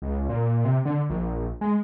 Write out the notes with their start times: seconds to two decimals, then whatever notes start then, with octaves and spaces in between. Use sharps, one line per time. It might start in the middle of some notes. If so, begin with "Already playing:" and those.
0.02 C#2
0.29 A#2
0.65 C3
0.85 D3
1.10 A#1
1.61 G#3